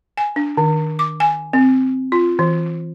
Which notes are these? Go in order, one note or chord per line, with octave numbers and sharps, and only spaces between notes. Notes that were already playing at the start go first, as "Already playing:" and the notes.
G#5
D4
D#3
D6
G#5
C4
F4
E3